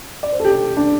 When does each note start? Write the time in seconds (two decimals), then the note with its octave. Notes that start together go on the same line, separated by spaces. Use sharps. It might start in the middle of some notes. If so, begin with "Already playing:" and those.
0.23 D5
0.32 C5
0.40 A4
0.45 G4
0.77 D4